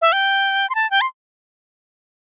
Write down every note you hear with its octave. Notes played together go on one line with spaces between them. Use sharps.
E5
G5
C6
A5
G5
C6